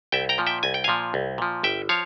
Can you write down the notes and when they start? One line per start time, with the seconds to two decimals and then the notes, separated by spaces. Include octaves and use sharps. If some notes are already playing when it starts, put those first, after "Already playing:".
0.12 C2 E5 G5
0.29 G5 A#5
0.38 A#2 F3
0.46 E5 G5
0.63 C2 G#5
0.74 G5
0.84 A#2 F3 F5 G#5
1.14 C2
1.38 A#2 F3
1.63 G1 E5 G5
1.89 F3 C#5 F5